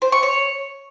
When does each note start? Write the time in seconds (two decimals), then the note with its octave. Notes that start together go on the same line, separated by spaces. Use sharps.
0.02 C5
0.12 C#6
0.23 C#5